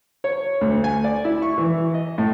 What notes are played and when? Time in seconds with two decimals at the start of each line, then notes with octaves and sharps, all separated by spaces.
0.24 C#5
0.61 D2
0.84 G#5
1.04 D5
1.25 E4
1.42 C#6
1.58 E3
1.94 D#5
2.18 A2